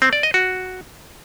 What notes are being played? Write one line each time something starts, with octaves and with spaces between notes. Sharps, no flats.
C4
D5
D#5
F#4